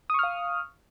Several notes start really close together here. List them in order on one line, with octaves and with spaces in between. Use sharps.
D#6 C#6 F6 F5